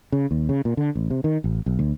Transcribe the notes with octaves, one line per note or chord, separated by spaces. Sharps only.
C#3
D#2
C#3
A#2
D3
A1
C3
D#3
A1
B1
D2